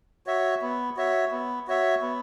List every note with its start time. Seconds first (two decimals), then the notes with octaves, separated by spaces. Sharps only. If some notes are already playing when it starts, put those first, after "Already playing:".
0.26 F#4 C#5 E5
0.62 B3
0.97 F#4 C#5 E5
1.31 B3
1.67 F#4 C#5 E5
2.02 B3